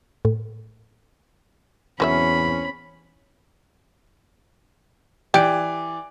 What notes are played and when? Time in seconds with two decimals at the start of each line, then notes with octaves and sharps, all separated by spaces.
0.25 A2
2.00 E2 F#3 C4 C#4 B4 E5 B5
5.34 E3 G4 D5 D7